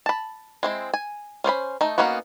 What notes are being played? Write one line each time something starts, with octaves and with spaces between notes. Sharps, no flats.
A5 B5
G#3 C4 E4
G#5
C#4 C5 C#5 B5
A3 D#4
A#3 B3 C#4 D#4 F#4